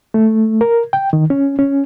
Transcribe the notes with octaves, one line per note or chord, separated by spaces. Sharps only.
A3
A#4
G5
D#3
C#4
C#4